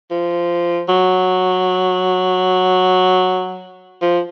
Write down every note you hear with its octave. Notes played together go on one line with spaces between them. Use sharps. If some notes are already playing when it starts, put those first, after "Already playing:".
F3
F#3
F3